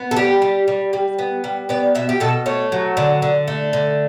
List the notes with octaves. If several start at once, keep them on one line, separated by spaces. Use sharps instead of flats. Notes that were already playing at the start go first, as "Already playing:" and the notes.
Already playing: B3
A4
G3 G4
G3
G3
G3
B3
G3
B3 D5
B2 E5
G4
B2 A4
A3 C#5
F#3
D3
D3
A3
D3